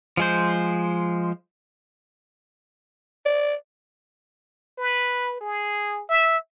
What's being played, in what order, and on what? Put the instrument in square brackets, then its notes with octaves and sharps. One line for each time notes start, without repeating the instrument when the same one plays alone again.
[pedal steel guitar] F3 G#3 C5
[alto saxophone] D5
[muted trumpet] B4
G#4
E5